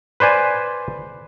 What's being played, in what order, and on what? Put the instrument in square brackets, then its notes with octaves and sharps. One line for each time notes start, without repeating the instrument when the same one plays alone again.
[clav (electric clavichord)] B4 C5 D5 G#5